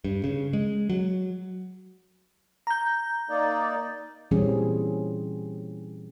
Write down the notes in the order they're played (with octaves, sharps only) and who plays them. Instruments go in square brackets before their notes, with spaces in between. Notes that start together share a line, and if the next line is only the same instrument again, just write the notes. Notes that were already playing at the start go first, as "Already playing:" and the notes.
[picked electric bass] G2
C#3
G#3
F#3
[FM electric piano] A#5 G6
[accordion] A#3 D#4 D5
[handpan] A#2 E3 G3 C4 C#4 G#4